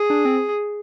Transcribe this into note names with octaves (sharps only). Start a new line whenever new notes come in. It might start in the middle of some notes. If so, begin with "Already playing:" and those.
Already playing: G#4
D4
C4